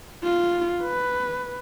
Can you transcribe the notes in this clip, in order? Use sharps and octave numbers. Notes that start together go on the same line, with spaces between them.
F4
B4